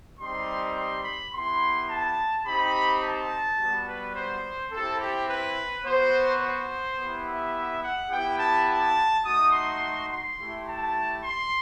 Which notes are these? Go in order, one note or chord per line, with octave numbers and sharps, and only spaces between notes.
G3 C4 D#4 G4 C6
C6
B5
B3 E4 G4 C6
A5
C4 D#4 G4 B5
A5
G3 B3 F#4
B4
C5
C4 E4 G4 A4
G4
B4
B3 F#4 C5
C5
B3 E4 G4
E5
F#5
B3 E4 G4 G5
A5
A5
A3 D#4 F#4 D#6
C6
C6
A3 E4 G4
A5
C6